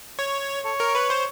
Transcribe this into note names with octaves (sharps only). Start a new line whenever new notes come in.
C#5
A4 C#5
A#4
B4
C5